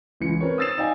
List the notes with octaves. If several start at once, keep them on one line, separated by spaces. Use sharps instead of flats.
C#2 E3 C#7
C4 A#4 B4 C#5
D#6 E6 A6 C7 E7
D#4 D5 D#5 F5 G5 G#5